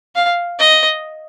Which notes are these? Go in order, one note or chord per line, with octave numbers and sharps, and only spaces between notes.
F5
D#5